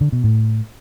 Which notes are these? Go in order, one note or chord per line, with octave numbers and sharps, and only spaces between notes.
D3
B2
A2